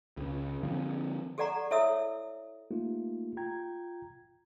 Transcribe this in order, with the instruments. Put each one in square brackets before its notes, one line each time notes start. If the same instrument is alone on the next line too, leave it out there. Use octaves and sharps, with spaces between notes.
[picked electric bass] C#2 C#3
D3 F3 C4
[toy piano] G4 A4 D5 F#5 A#5 C#6
E4 A4 C#5 E5 D#6 E6
[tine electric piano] A3 A#3 D#4 F4 G4
F4 G5 A#5 G#6